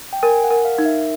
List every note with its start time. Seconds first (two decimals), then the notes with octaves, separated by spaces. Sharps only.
0.13 G5
0.23 A#4 G#5
0.44 F#5
0.50 A#4
0.65 F5
0.78 D#4
0.85 E5